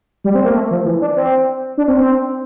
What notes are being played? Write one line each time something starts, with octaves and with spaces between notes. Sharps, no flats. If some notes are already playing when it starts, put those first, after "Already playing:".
G3
C4
A#3
A3
F3
E3
D4
C4
D4
C4
C4